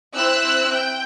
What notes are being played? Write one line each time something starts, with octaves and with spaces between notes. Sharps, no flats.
C4 E4 E6 F#6
G5